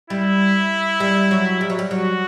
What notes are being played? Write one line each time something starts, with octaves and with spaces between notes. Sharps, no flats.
G3 E4
G3
F#3
G3
F#3
G3
F#3 F#4